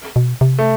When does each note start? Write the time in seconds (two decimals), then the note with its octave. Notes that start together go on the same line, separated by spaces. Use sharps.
0.16 B2
0.41 C3
0.59 A3